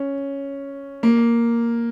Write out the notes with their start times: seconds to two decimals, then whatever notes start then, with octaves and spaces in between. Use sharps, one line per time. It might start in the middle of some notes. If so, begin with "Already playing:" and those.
Already playing: C#4
1.03 A#3